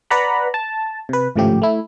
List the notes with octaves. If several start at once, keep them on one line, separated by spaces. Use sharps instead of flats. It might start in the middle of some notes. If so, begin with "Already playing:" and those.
B4 D5 F#5 A#5 B5
A5
C3 B4
G#1 A2 C#3 F3 A3 G4
A3 E4